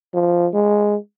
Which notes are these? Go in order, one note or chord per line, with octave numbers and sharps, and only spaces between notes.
F3
G#3